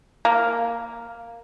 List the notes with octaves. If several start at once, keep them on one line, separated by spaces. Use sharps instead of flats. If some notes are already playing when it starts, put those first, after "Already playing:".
A#3